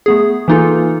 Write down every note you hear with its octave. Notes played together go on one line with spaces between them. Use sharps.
A3 B3 G#4
E3 A#3 D#4 F4 A4